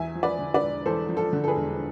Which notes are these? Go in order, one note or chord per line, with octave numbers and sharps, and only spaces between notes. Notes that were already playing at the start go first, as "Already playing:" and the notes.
Already playing: E2 E5 G#5
F3
B4 D5
D3
B4 D5
E1
E2 A4 C5
F3
F4 A4
D3
A4
G#4 B4
E1